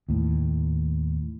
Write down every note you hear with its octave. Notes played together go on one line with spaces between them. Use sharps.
D#2 A2